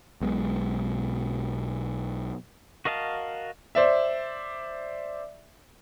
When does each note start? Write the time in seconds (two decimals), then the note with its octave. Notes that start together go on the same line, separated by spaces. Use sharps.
0.21 B1 B2 G#3
2.85 F#4 A#4 D#5 F5 A5
3.75 C5 D5 E5